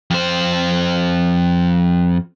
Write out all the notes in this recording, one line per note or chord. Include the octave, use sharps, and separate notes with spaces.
F2 C5